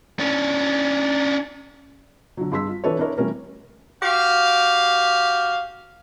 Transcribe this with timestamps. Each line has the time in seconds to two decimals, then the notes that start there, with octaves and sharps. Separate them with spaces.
0.19 C#4 D4
2.37 D3 F#3
2.52 G2 G#4 C6 E6 B6
2.68 F4
2.84 E3 D4 E4 A4 B4 C#5
2.99 D4 E4 A#4 C#5
3.18 E3 G3 A3 C#4 A#4
4.03 F#4 G4 F5